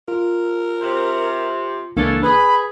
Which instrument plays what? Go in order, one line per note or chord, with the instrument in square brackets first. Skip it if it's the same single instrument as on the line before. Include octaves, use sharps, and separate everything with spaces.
[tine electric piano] F4 [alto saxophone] A#4
[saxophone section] C3
[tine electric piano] C#2 E3 A#3 [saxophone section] C#4 E4 A4 [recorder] D4
[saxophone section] G#4 [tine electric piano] B4 [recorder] B5